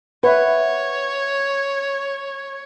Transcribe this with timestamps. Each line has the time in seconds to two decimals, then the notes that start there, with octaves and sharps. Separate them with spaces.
0.24 B4 C#5 E5 F#5